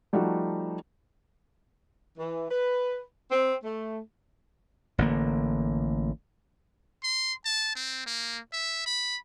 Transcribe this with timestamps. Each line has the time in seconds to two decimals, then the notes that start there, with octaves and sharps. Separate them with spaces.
0.13 F3 G3 A3 D#4 F#4
2.17 E3
2.49 B4
3.31 C4
3.63 A3
4.98 A1 D3 F#3 A#3
7.04 C6
7.45 A5
7.76 C4
8.06 A#3
8.52 E5
8.86 B5